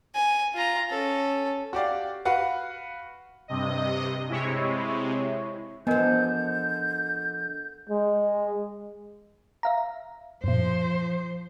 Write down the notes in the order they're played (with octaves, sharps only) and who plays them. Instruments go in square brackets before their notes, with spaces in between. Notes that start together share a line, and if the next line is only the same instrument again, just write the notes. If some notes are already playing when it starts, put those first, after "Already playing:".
[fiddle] G#5
F4 A#5
C#4 A4
[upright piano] F#4 G4 D5 F5
F#4 B4 F5 F#5
[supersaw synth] G2 C3 D#5
[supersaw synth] C3 G#3 [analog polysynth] E4 C#5
[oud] D3 F3 [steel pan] B3 [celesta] A#4 D#5 G#5 [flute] G6
[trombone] G#3
[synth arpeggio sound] E5 F5 A#5
[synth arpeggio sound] F#2 A#2 [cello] F3 C5